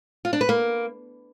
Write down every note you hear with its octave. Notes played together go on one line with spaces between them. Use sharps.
F4
D4
B4
A#3